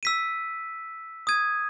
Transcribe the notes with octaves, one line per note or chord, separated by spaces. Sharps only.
E6 B6 D#7
D#6 G#6 D#7